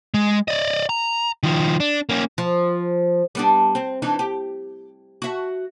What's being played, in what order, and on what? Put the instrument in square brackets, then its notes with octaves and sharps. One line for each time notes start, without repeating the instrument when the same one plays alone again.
[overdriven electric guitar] G#3
D5 D#5
A#5
D#3 F3
D4
A#3 C#4
[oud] F3
G3 B3 D4
C4
E3 D4 D#4
G4
F#4 E5